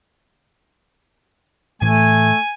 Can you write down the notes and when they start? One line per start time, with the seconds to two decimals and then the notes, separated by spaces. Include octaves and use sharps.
1.82 A2 E3 A3 G#5